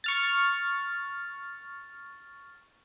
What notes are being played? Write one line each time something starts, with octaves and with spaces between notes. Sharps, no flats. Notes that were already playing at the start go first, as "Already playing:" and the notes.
C#6 F6 A6